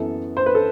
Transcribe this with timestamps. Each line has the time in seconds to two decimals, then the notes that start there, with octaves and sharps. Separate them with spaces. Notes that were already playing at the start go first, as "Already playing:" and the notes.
Already playing: F#2 E3 B3 A4
0.37 C5
0.46 B4
0.55 A4